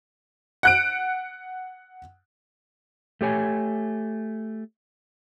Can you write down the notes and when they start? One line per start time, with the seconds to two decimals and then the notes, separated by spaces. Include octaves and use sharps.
0.63 F#5 F#6 D7
3.21 A3 G4 C#5 G#5